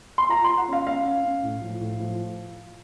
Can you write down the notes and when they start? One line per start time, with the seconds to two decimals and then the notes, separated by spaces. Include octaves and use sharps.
0.18 C6
0.29 F4 A#5
0.44 F4 C6
0.57 F#5
0.68 C#4 F5
0.86 C#4 F5
1.05 C#4
1.25 C#4
1.43 A2
1.62 F3
1.80 A2
2.00 F3